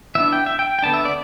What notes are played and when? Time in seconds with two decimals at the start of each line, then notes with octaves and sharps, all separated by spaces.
0.15 E3 B3 D4 E5
0.33 G5
0.46 E5
0.59 G5
0.79 G5
0.83 D3 B3 D4 A5
0.94 E5
1.05 D5